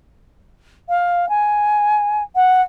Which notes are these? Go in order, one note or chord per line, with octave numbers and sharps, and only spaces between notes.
F5
G#5
F#5